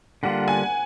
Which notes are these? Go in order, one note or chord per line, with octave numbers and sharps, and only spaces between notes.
D3 G3 A#3 D4 F4 F#5
G#5